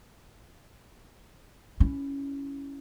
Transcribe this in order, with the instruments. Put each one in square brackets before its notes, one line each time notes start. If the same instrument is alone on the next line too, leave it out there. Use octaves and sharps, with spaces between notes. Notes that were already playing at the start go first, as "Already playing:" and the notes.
[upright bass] C#4 E4